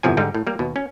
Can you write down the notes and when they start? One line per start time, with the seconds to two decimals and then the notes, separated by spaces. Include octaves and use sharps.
0.03 G1 E2 C3 F3 G#5
0.17 G#2 D3 G3 D#4
0.35 A2
0.47 G3 A#3
0.59 D#2 B2
0.76 C#4